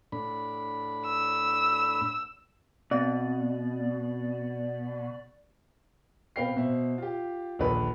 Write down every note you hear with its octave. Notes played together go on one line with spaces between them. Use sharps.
A2 D4 B5
E6
B2 C4 D5
B2 C4 B4 F5 G5 C7
B2 C5 E5
F4 G4
A#1 D#2 D3 B4